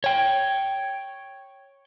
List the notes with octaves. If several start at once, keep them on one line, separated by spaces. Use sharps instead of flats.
C#5 G5